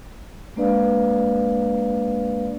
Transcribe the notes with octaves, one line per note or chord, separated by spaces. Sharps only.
G#3 A#3 D4 B4 D5 F5